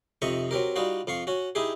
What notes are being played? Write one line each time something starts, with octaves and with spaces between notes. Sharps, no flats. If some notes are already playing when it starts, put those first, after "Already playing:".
F2 C3 D#4 D#5 E5 C#6
F#3 C4 G4 A#4
G3 D#4 F4 F#4
F2 F4 C6 C#6
C#4 F#4
D#4 E4 G4 G#4